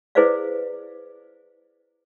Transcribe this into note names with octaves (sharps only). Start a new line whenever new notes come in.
E4 G#4 B4 C5 D5 F5